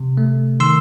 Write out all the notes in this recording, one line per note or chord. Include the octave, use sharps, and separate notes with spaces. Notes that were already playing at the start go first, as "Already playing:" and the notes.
Already playing: C3
A3
D#3 C6 E6